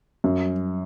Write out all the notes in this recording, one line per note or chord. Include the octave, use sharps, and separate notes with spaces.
F#2